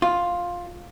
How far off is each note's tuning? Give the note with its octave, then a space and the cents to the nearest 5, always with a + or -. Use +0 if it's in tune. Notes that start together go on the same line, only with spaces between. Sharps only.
F4 +10